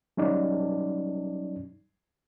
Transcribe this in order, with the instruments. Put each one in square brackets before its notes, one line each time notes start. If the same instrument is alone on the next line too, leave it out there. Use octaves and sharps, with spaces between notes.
[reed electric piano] F#3 G3 C#4 D#4 D5